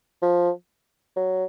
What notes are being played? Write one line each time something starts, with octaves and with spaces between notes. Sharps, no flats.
F3
F#3